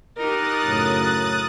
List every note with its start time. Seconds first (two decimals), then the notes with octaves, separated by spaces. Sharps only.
0.18 D#4 G4 A#4 D#6 F#6 A6
0.65 F#2 A2 C#3